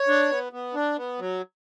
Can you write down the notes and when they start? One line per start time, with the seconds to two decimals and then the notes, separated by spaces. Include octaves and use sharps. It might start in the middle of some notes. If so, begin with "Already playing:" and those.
Already playing: C#5
0.08 D4
0.31 B3
0.53 B3
0.74 D4
0.97 B3
1.19 F#3